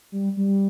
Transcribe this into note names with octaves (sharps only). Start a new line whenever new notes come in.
G3
G3